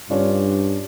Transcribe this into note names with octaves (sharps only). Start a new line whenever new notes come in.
G2 C#4 D4 F4